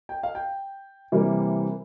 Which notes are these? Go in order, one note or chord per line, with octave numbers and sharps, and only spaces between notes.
G5
F5
G5
C3 E3 G3 A#3